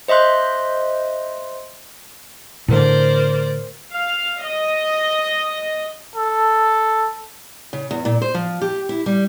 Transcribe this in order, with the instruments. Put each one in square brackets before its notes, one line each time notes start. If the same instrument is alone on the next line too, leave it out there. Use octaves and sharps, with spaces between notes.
[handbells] C5 D#5 E5 C6 F#6
[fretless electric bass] A2 D3 A3 [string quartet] A#4 C5 D5
[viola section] F5
D#5
[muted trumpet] A4
[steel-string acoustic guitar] C#3
E2
A#2
C5
F3
G4
E4
G3